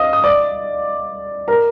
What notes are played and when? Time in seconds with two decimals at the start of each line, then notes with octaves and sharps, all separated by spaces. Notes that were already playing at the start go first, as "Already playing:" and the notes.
Already playing: D#5 F5 D#6
0.13 D#6
0.24 D5 D6
1.48 A#4 A#5